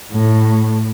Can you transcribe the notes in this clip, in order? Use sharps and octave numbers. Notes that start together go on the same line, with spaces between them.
A2